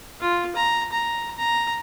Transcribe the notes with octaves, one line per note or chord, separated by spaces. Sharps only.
F4
A#5
A#5
A#5